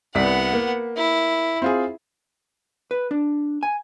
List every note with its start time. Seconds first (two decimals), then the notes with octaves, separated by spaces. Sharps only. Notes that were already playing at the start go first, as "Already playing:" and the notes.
0.15 C2 B3 D5 F#5 B6
0.53 A#3
0.96 E4
1.62 C4 F4 G#4
2.91 B4
3.11 D4
3.63 G#5